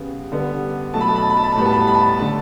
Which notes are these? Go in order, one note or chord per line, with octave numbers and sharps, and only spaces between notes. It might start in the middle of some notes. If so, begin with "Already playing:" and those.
Already playing: C#3 G3 B3
D3 G3 B3
B2 F#3 A3 A5
B5
A5
B5
A5
B5
A5
B5
A5
A2 G3 B3 B5
A5
B5
A5
B5
A5
B5
A5
D3 A3 A5